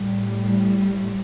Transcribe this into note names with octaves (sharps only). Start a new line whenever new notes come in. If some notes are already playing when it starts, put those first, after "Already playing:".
Already playing: A2 G3